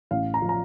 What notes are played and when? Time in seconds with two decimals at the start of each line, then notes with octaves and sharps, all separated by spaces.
0.11 A1 F5
0.34 A#5
0.42 F3
0.49 A#5